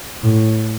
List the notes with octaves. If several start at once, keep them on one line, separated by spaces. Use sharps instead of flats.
A2